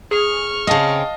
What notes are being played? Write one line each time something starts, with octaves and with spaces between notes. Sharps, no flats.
G#4 C#6 F6
C#3 C4 D#5 F5 A5